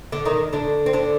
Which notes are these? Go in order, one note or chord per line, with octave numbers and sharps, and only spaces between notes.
D3 D4
D#3 D#4
D3 D4
C4
D3 D4